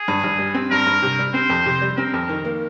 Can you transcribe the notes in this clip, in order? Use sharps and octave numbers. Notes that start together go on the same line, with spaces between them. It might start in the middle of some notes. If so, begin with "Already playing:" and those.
Already playing: G#4
G2
G2
G3
C4
G2 A#4
G2
C3
G3
C4 C5
F2
C3
G3
C4 A#4
F2
D#3
A#3